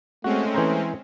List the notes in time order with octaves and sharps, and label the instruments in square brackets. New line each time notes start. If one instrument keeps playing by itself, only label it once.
[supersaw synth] G#3 C4 C#4 [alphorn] A3 [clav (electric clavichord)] F#4
[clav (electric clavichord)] E3 C5 A#5